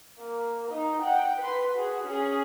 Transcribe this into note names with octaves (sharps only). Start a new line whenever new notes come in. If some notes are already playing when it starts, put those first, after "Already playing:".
A#3
D#4 D#5
F#5 G5
B4 C6
F#4 G#4
C#4 G#4